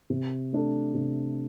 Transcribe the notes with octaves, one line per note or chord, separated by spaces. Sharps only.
C3
A3 D4 A4
C3